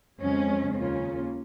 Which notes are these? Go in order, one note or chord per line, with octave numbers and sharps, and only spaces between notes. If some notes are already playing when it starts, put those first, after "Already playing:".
F2 C#3 G#3 C#4
D#2 C#3 A#3 C#4 F4